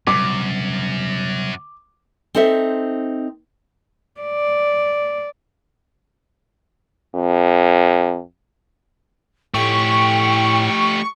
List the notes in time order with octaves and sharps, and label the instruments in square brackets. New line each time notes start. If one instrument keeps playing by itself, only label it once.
[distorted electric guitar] F#2 [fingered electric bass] C3 F#3 G3 [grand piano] D6
[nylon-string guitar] C4 D#4 A4 C5 E5
[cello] D5
[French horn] F2
[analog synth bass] A2 [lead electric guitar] A3 G4 [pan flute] G5 [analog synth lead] C#6